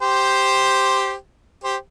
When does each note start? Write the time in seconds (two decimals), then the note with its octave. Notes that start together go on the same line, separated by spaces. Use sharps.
0.01 G4 C5
1.64 G4 C5